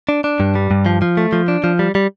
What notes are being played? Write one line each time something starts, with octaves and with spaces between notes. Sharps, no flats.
D4
D4
G2
G3
G2
F3
F3
A3
F3
D4
F3
G3
G3